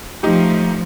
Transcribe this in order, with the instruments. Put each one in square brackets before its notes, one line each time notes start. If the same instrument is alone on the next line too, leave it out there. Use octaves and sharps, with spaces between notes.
[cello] F3 A3 [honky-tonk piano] D#4 G4